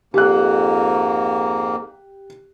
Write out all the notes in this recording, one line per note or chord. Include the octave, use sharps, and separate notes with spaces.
F2 G#2 A#3 G4 F#6